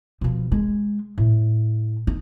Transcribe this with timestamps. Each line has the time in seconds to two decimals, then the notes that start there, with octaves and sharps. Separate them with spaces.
0.21 B2 F3
0.52 G#3
1.18 A2
2.07 D#4